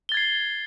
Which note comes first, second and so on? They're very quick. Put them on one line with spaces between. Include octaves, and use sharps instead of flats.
G7 A6 G#6 C7